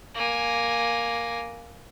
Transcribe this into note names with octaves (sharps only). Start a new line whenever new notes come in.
A#3 G#5